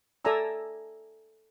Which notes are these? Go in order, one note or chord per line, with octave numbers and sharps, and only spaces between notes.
A4 D5 E5 G#5 A#5 E6